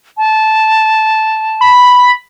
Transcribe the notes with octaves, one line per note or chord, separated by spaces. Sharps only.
A5
B5